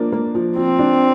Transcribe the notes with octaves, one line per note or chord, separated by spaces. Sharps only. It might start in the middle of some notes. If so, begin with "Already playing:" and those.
Already playing: F3 A#3 D4
A#3
F3
F3 C4
D4